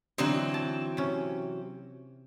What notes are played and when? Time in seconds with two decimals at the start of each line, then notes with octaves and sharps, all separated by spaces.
0.18 D3 E3 F#3 C4 D#4
0.54 A5
0.97 C3 C#4